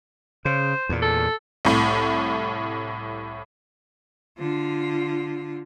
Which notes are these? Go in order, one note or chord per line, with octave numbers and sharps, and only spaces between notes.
C#3 C5
E2 A#2
A4
C2 A2
D3 F4